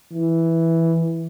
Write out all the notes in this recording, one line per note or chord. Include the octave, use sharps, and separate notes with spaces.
E3